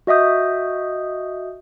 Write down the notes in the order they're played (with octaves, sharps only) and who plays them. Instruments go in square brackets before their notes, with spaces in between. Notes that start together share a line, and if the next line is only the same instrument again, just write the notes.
[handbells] F#4 D#5 E5 D#6 G6